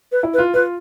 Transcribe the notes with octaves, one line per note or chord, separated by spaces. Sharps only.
B4
E4
B4
F4
F4 B4